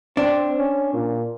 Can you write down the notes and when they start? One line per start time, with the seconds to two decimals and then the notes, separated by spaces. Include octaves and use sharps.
0.17 C4 D4
0.58 C#4
0.94 A#2